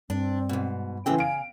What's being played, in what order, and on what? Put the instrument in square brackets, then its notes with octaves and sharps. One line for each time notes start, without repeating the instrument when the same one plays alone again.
[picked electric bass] G2 [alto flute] C4 [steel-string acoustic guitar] D4
[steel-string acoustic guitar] G#2 B2
[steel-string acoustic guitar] A2 C4 G5 [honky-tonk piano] C#3 E3 [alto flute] G#5
[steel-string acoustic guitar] C#3 [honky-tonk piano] F5 D7